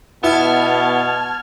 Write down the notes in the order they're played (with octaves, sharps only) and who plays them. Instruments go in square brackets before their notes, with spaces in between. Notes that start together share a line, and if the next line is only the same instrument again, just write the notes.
[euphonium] B2 [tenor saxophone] B3 [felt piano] E4 [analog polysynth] A5 F6 G#6